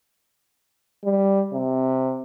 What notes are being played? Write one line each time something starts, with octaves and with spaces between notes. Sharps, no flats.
G3
C3